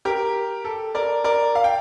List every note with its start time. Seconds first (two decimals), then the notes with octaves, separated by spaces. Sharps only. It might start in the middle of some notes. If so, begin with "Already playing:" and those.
0.05 G4 A#4
0.65 A4
0.95 A#4 D5
1.24 A#4 D5
1.55 F5
1.64 G5